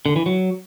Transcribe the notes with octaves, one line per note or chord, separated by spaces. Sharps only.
D3
E3
F#3